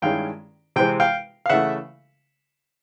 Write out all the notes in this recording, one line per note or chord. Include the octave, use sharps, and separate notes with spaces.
G2 D#3 G#3 C#4 E4 F5 G5
C3 E3 G#3 C4 G5
F5 G5
F5
C#3 E3 A3 E5 F#5